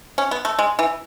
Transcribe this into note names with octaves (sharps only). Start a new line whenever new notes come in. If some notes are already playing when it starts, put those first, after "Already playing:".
C#4
B3
A3
G#3
E3